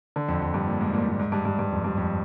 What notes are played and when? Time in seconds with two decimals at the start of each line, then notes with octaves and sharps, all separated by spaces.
0.16 D3
0.28 F2
0.42 F2
0.54 G2
0.67 A#2
0.81 G#2
0.94 A#2
1.07 A#2
1.20 G#2
1.32 G2
1.45 G2
1.59 G2
1.72 F2
1.84 G2
1.97 F2